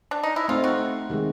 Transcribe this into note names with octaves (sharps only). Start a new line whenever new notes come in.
D4
D#4
E4
A3 C4 D#4 F4
F#4
C3 D#3 G#3